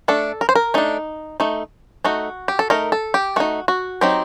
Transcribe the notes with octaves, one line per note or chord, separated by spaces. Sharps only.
A3 D4 A4
A#4
C5
A#4
A3 D4 D#4
A3 D#4
A3 D#4 F#4
G4
A4
A3 D#4 A#4
A4
G4
A3 D#4 F#4
F#4
F#3 C4 D#4 G4